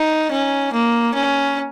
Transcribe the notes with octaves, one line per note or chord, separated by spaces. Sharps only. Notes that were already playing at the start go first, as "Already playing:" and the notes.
Already playing: D#4
C#4
A#3
C#4